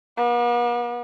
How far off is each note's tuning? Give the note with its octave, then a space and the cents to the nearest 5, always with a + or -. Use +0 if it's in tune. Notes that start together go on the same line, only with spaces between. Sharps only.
B3 -45